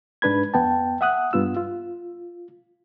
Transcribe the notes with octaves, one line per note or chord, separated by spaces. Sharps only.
G#2 D4 B4 B5 G#6
F2 B3 G5 A5
E5 F#5 D#6 F#6
G2 B3 F4 E6
F4